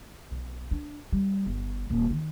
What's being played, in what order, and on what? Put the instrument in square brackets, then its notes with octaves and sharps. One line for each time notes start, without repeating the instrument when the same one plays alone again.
[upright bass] B1
D4
G3
G1
D#1
D#3